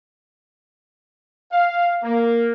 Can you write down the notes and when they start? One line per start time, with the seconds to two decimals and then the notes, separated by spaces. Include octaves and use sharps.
1.52 F5
2.03 A#3